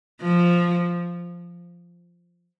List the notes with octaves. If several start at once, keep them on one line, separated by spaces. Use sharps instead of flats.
F3